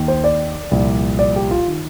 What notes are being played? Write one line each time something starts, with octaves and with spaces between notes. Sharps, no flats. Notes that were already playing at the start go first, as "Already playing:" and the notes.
Already playing: D#2 D#3
C5
D5
C2 A#2 F3
D5
G4
F4
D#3